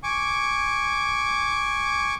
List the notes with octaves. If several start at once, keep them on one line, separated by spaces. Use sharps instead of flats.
G#5 C#6 D6